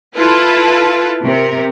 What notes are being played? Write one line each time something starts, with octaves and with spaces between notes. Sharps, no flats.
E4 F4 A4 B4
C3 A#4